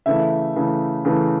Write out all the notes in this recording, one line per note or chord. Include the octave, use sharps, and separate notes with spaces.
C#3 E3 A3 E5
C#3 E3 A3
C#3 E3 A3